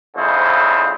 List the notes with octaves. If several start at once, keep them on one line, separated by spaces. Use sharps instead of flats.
A#1 F2 G#2 C#3 E4 C5